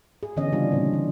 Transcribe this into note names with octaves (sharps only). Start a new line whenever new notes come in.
G#4
D3 E3 B3 C#4 D#5
C#3 E3 G3 D4 F4
A#2 C4
E3